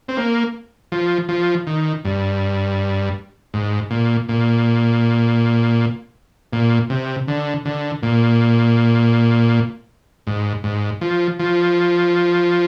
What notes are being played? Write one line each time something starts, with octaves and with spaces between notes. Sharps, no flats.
C4
A#3
F3
F3
D#3
G2
G#2
A#2
A#2
A#2
C3
D3
D3
A#2
G#2
G#2
F3
F3